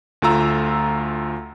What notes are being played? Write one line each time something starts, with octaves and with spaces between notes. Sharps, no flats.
D2 A3 F4 A#5 E6